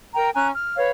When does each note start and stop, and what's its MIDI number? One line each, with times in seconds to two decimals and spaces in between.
0.15 0.30 70
0.15 0.30 79
0.15 0.30 82
0.35 0.49 61
0.35 0.49 80
0.35 0.49 82
0.35 0.49 90
0.55 0.76 89
0.76 0.91 71
0.76 0.91 73
0.76 0.91 77